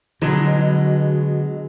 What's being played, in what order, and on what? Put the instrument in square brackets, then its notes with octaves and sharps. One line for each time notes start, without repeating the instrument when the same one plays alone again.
[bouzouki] B2 G#3 [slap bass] D3 [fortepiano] F#3 [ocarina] F#4